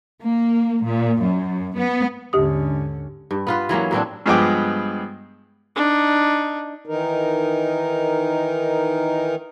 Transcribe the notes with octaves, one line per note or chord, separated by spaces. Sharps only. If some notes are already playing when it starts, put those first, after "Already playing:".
A#3
A#2
F#2
B3
D#2 G#2 D3 C#4 G4 D#6
G2
B3 F4 B4
E3 F#3 A#3 C#4
A2 F#3 C4 D4
G2 F3 G#3 B3 G5 D6
D4 D#4
D#3 E3 D#4 A#4